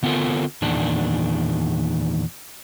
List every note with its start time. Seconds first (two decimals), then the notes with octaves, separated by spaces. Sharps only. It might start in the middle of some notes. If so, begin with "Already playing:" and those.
0.03 D3 B3 C4 F4 A4 A#4
0.62 E2 A#2 D#3 D4